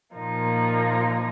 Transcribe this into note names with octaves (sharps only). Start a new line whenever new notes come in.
A#2 F3 A#3 D#4